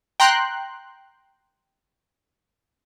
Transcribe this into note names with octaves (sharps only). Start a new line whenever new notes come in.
G5 A#5 C6 F#6